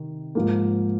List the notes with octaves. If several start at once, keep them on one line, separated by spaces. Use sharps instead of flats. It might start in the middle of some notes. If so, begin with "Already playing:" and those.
Already playing: C3 D#3
G#2 F3 A#3